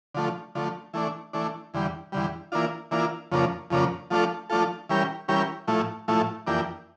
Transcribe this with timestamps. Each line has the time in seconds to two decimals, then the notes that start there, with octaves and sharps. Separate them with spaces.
0.14 D3 F3 A3
0.55 D3 F3 A3
0.94 E3 A3 D4
1.33 E3 A3 D4
1.74 E2 D3 G3
2.12 E2 D3 G3
2.52 E3 A#3 D4 F4
2.91 E3 A#3 D4 F4
3.31 F2 C#3 F3 A#3 D4
3.70 F2 C#3 F3 A#3 D4
4.10 F3 A3 D4 F4 A4
4.50 F3 A3 D4 F4 A4
4.89 E3 G3 C#4 G4 A#4
5.28 E3 G3 C#4 G4 A#4
5.68 A2 F3 A3 E4
6.08 A2 F3 A3 E4
6.47 F2 E3 A#3 D4 G4